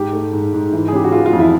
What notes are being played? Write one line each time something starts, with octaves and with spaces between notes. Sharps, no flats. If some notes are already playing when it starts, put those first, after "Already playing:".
Already playing: G#2 G4
A3
G#2
G#2
E3
G#4
C#3 G4
F#4
E3 F4
F4
F2
E4